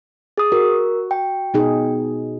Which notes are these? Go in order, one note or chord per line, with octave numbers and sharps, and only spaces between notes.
G#4 D#6
F#4 A#4
G5
B2 D#4 G#4